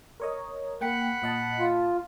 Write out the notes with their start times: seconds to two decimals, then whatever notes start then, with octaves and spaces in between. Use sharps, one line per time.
0.20 A#4 C#5 D#5
0.81 A#3 F#5 G5 B5 C#7
1.22 A#2 D#5 A5
1.59 F4